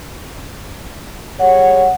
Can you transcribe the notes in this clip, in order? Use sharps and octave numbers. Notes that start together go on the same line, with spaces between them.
G3 G#4 C#5 F#5